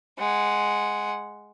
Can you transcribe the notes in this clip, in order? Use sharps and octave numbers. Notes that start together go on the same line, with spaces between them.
G#3 F#5